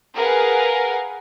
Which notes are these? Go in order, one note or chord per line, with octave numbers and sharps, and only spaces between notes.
G#4 A#4 B4 F5 F#5